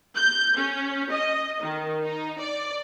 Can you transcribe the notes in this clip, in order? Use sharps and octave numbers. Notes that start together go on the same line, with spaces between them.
G6
C#4
D#5
D#3
D#4
D5